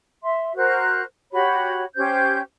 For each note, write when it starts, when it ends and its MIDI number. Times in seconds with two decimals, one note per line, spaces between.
0.23 0.55 76
0.23 0.55 84
0.55 1.02 66
0.55 1.02 70
0.55 1.02 72
0.55 1.02 90
1.32 1.83 66
1.32 1.83 67
1.32 1.83 73
1.32 1.83 83
1.96 2.40 61
1.96 2.40 67
1.96 2.40 72
1.96 2.40 91